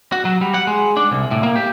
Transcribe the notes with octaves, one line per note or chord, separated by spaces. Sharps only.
F#4
F#3
G3
F#5
G#3
D4
C2
A2
A#3
G4